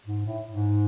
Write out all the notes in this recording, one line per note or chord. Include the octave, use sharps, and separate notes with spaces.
G#2
A2
G#2